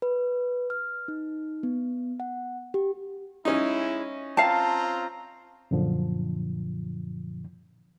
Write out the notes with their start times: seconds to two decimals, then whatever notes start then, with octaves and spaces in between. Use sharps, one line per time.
0.02 B4
0.70 F6
1.08 D#4
1.63 B3
2.20 F#5
2.74 G4
3.45 G#3 C#4 D#4 E4
4.37 C4 F4 F5 A5 A#5
5.71 F#2 A#2 D3 F3